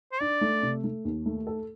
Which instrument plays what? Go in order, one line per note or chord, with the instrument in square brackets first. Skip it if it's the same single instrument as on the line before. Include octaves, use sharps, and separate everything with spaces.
[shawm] C5
[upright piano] D4 [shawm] D5
[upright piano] A3
C3
A3
D#2
A3
A4